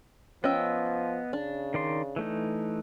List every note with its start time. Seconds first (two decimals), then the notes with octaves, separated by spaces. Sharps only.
0.44 F3 B3 C#4 D#5 G5 E6
1.33 C#3 D4
1.74 D#3 D5 C6
2.16 E3 A3 D#4